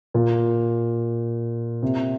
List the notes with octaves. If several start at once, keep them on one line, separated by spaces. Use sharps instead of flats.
A#2
C3